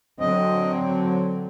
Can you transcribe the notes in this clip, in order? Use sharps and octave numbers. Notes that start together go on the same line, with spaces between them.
D3 F#3 C4 D#5